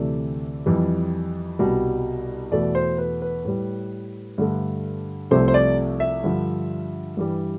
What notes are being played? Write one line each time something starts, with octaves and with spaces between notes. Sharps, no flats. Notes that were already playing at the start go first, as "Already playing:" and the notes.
Already playing: D2 C3 E3 A3 D5
F2 E3 G3
C2 B2 G3
E2 B2 A3 D5
C5
B4
B4
A2 G3
G2 D3 A3
C2 C3 F3 A3 C5
C5
D5
E5
G2 D3 F3
G2 E3 G3